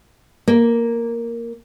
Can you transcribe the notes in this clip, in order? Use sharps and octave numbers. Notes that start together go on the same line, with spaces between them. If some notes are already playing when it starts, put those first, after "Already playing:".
A#3